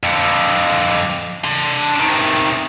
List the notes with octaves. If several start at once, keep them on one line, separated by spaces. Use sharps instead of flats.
F2 D3
D4 C6
C3 D#3